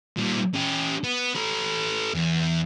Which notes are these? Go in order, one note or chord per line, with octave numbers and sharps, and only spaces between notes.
A#2 G3
C#4 G4
B3
A4 B4
E2